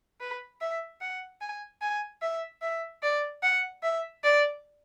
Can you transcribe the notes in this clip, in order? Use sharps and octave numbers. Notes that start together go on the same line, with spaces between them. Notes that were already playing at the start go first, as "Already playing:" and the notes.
B4
E5
F#5
G#5
G#5
E5
E5
D5
F#5
E5
D5